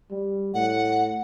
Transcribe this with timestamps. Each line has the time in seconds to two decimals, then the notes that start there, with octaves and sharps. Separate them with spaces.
0.11 G3
0.54 A2 F#5